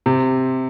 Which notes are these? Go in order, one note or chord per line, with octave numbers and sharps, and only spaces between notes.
C3